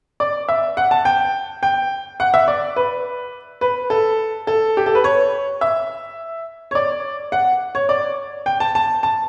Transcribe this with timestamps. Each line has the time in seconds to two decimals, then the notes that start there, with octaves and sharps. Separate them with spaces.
0.20 D5
0.49 E5
0.77 F#5
0.91 A5
1.05 G5
1.63 G5
2.20 F#5
2.34 E5
2.48 D5
2.76 B4
3.61 B4
3.90 A4
4.47 A4
4.77 G4
4.86 A4
4.95 B4
5.04 C#5
5.61 E5
6.71 C#5
6.75 D5
7.32 F#5
7.75 C#5
7.89 D5
8.46 G5
8.60 A5
8.75 A5
9.03 A5